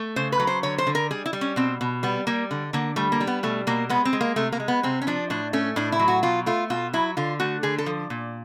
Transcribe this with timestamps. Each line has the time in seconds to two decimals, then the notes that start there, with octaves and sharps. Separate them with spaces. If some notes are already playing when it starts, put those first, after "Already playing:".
Already playing: A3
0.16 C#3 C5
0.32 B4
0.40 F#3
0.47 C5
0.63 D3 C#5
0.78 C5
0.87 D3
0.95 A#4
1.11 G3 G#4
1.26 E4
1.33 G3
1.41 C#4
1.56 B2 C4
1.81 B2
2.03 G3 B3
2.27 G3 A#3
2.51 D3
2.73 D3 A#3
2.96 G3 A3
3.12 A#3
3.20 G3
3.27 B3
3.43 B2 A3
3.67 B2 A#3
3.89 G#3 B3
4.05 C4
4.13 G#3
4.21 A#3
4.36 C3 A3
4.52 A#3
4.60 G#3
4.68 B3
4.83 C3 C4
5.02 C#4
5.07 F3 D4
5.30 A2 D4
5.53 A3 C#4
5.76 A2 D4
5.92 E4
5.99 F#3
6.08 F#4
6.23 B2 F4
6.46 A3 F4
6.70 B2 F4
6.93 F#3 E4
7.17 D3 F4
7.40 A3 F#4
7.63 D3 G#4
7.78 A4
7.86 F3
8.10 A#2